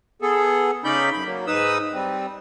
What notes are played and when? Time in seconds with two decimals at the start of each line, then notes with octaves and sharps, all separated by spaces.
0.22 B3 G#4 A4
0.84 C#3 C#4 D#4 D5 B5 G6
1.13 F#2 B5
1.25 F#3 A#3
1.47 G#2 D#4 B4 D#6 E6
1.93 G3 C4